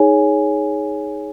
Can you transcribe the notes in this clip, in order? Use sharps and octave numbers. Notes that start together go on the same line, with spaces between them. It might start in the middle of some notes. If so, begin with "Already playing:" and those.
Already playing: D#4 G#4 C#5 G#5